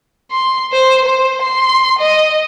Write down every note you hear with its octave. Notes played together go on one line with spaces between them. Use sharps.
C6
C5
C5
C6
D#5